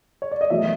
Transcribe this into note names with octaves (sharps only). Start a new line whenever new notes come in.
C#5
D5
D#5
E2 B2 F#3 A3 E5